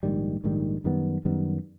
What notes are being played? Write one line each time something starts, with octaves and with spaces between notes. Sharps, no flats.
A#1 G#2 D#3 G3
A#1 G#2 D#3 G3
F#2 D#3 G3 B3
F#2 D#3 G3 B3